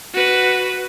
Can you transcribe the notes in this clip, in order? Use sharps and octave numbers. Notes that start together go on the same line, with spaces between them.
F#4 B4